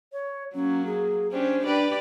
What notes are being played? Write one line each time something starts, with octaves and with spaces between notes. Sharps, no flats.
C#5
F#3 A#3 C#4
G#4
C#4 D4 G4 C5
D4 G4 B4 D5